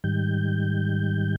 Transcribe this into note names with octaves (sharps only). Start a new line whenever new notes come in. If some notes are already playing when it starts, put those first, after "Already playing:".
G#2 D#3 G3 G6